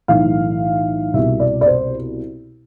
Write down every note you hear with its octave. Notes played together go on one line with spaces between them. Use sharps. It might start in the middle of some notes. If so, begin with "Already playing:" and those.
B1 A2 E3 F5
C2 B2 E5
D5
D5
C5